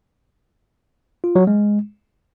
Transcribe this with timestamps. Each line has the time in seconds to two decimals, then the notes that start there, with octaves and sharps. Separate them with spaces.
1.24 F4
1.36 F#3
1.47 G#3